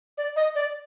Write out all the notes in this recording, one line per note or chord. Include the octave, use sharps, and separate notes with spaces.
D5
D#5
D5